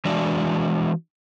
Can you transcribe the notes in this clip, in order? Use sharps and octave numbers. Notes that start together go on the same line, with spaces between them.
E3 G#3 D4 F#4 D5